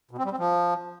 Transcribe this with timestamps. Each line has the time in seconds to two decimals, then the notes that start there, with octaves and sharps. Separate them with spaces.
0.11 B2
0.18 C4
0.25 G3
0.32 C4
0.39 F3